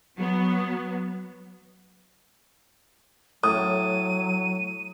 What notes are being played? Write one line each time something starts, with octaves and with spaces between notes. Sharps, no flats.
F#3 B3
A2 F#3 D#6 D#7